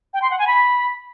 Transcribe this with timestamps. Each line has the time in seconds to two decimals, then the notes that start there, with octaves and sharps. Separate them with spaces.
0.14 G5
0.22 C6
0.30 F#5
0.39 G#5
0.47 B5